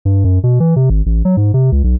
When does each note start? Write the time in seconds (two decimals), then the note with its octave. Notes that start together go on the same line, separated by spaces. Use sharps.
0.05 G2
0.24 F#2
0.44 B2
0.60 E3
0.76 C3
0.90 G#1
1.06 A1
1.25 F#3
1.37 G#2
1.54 C3
1.72 C#2
1.84 B1